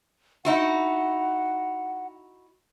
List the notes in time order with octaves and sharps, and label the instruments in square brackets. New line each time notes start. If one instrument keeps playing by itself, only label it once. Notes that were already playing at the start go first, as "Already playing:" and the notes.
[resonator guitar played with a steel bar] D#4 E4 F#4 [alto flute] F#5